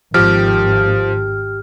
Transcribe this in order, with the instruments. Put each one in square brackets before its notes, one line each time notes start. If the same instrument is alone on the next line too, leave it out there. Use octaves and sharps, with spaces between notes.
[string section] G#1 [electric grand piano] F3 [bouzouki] G4 [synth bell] F6